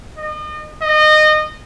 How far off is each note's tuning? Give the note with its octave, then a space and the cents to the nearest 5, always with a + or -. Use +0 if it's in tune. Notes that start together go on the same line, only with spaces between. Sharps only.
D#5 -35
D#5 -25